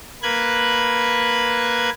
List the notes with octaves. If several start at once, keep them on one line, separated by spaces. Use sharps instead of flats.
A#3 B4 F#6 G#6